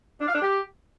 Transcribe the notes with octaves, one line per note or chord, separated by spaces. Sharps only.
D4
F5
D4
G4